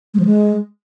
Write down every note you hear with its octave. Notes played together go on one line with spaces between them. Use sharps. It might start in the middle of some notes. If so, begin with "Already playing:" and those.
G#3
F3
G#3